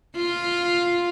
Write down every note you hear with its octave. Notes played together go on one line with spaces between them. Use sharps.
F4